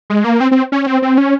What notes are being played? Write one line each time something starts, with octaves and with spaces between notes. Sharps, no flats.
G#3
A#3
C4
C4
C#4
C4
C4
C#4